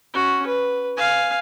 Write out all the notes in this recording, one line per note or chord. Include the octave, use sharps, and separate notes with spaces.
C#4 F#4
B4
F5 G#5